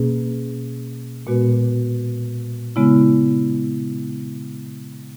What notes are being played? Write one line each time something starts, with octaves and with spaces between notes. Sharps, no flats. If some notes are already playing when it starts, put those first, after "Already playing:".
Already playing: B2 A#3 C#4 G#4
A#2 G#3 B3 F#4 B4
C#3 G#3 B3 E4